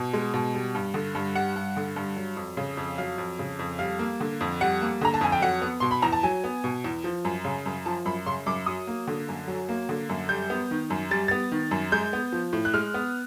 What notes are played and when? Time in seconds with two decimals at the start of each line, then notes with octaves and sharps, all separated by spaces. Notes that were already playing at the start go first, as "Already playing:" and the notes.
Already playing: B2
0.13 G#3
0.34 B2
0.54 G3
0.75 G2
0.94 D3
1.15 G2
1.35 G3 F#5
1.56 G2
1.77 D3
1.96 G2
2.16 F#3
2.37 F2
2.57 C#3
2.77 F2
2.98 F#3 F5
3.18 F2
3.39 C#3
3.59 F2
3.79 G3 F5
3.99 A#3
4.20 D3
4.41 F2
4.61 G3 F#5
4.81 A#3
5.01 D3 A#5
5.14 A5
5.21 F2 G#5
5.32 G5
5.41 F#3 F#5
5.62 B3
5.80 B2 C6
5.91 B5
6.02 E2 A#5
6.12 A5
6.23 F#3 G#5
6.44 B3
6.64 B2
6.84 E2
7.04 F3
7.25 F#2
7.45 C#3
7.66 F#2
7.86 F3 A5
8.06 F#2 B5
8.26 C#3 C6
8.46 F#2 D6
8.66 F#3 D#6
8.87 A#3
9.08 D3
9.29 F#2
9.48 F#3
9.69 A#3
9.89 D3
10.09 F#2
10.29 G3 G6
10.50 B3
10.71 D#3
10.90 F#2
11.11 G3 A6
11.28 A6
11.31 B3
11.52 D#3
11.71 F#2
11.92 G#3 G6
12.13 B3
12.32 F3
12.53 A2
12.65 F#6
12.74 G#3 F6
12.94 B3